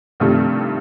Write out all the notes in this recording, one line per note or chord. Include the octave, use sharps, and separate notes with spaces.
G2 C3 D#3 F3 G3 A3